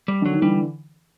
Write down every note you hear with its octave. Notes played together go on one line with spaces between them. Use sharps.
G3
D3 F#3
D#3
D3 E3 G3